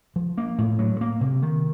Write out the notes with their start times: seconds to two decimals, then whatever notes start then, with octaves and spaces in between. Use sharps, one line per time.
0.16 F3
0.37 A#3
0.58 A2
0.79 F#3
1.01 A#3
1.21 C3
1.42 D#3